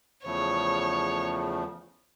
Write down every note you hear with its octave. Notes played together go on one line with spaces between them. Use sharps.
E2 C#3 F3 A3 C#5